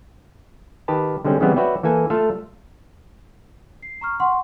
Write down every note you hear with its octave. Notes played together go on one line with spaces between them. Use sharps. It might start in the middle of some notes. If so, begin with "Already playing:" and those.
D#3 G4 B4 A5
D3 G3 G#3 C4 C#4
C#3 E3 G3 G#3 B3 C4
F#4 B4 C#5 D5 E5 G5
E3 A#3 A4 G#5
A3 F4 A4 E5 F5
C7
A#5 C#6 F6
F#5 C6 C#6